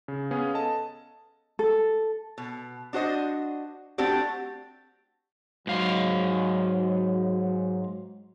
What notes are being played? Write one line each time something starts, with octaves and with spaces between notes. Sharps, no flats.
C#3
B3 C#4 G#4 F5
A4 D#5 A5
A4
B2
D4 F#4 C5 D#5
A3 C4 D4 F#4 G4
G#2 F#3 F5